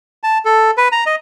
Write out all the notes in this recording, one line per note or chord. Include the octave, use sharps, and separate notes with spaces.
A5
A4
B4
A#5
D#5